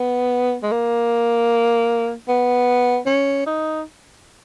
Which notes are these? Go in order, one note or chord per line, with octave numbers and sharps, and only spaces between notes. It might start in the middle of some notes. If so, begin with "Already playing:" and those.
Already playing: B3
G#3
A#3
B3
C#4
D#4